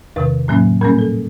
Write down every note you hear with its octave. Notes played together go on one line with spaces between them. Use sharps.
E2 C3 D#3 B4
A2 F#3 A#3 C#4
A#2 G3 A#3 C#4 A#4
A4